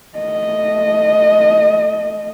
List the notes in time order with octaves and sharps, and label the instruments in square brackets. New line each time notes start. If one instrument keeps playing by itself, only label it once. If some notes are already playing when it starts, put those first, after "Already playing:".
[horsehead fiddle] A3 D#5